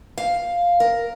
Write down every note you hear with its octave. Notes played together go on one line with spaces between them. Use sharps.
F5
A#4